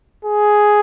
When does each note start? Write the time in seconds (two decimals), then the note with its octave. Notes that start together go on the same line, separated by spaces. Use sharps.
0.25 G#4